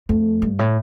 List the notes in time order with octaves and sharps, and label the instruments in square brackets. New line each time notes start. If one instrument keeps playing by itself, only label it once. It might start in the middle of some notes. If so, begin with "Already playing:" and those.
[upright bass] F2 [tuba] A3
[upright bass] G2
A2